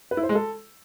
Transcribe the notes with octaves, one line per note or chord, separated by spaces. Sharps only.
B4
E4
C5
G#3
A4